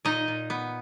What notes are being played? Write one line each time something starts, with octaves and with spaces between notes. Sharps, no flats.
A#2 D#4 D#5
A#2
B3